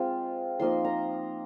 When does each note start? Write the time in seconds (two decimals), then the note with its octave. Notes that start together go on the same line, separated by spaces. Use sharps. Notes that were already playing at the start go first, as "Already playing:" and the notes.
Already playing: G#3 C4 F4
0.59 F3 A#3 D#4 C6
0.84 A#5